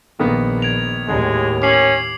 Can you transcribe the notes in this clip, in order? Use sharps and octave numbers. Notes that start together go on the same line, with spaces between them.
A#1 D#3 A#3 B3
G#6 D7 F7
D#2 A2 G#3
C#4 D6 C7 F#7